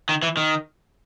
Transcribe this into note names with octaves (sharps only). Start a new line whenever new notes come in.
D#3
E3
D#3